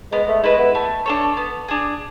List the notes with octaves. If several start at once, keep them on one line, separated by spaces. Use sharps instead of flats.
G#3 B3
A3
G#3 E4 B4
B3
A3
D4 A4 C#5
B3
D4 G#4